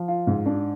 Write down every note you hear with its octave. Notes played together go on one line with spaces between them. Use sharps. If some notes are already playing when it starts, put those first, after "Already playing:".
Already playing: F3
F4
G#2
D4